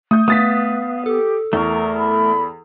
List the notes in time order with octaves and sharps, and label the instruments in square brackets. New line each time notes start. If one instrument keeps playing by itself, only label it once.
[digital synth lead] A3 [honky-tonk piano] D#6 G6
[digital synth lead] A3 [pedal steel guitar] B3 [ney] F5 [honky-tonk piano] D#6 A6 B6
[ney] G4 [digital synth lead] A4
[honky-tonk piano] E2 [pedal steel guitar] A3 A#4 [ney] C#6
[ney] B5